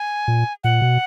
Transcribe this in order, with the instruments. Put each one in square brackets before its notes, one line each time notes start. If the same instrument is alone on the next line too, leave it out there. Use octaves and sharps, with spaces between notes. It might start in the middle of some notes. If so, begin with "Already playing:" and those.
Already playing: [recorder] G#5
[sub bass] A#2
[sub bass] A#2 [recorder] F#5
[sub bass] B2